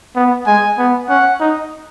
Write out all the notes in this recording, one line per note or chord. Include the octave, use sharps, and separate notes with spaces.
B3
G#3 G#5
B3
C#4 F#5
D#4